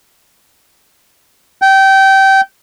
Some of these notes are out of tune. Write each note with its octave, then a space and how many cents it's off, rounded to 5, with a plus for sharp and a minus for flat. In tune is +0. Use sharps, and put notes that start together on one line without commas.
G5 -20